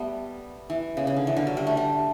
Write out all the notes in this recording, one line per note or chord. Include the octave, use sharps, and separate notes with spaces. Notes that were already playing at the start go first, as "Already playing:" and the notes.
Already playing: G3 A3 B3
E3
C#3
C#3
D3
E3
D3
F#3
G3
A3
G3